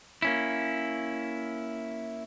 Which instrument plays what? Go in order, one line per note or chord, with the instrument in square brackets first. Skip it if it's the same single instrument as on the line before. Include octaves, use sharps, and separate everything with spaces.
[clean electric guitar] A#3 C#4 E4